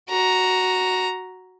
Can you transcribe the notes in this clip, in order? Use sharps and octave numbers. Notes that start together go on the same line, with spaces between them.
F#4 A#5